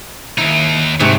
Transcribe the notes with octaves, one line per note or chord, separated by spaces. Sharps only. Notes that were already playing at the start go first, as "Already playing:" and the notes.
D#2 D#4 E4
G#2 C3 F#3 A3 B3